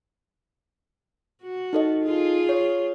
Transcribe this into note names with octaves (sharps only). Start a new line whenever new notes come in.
F#4
D#4 A4 D#5
F4 G#4
C#5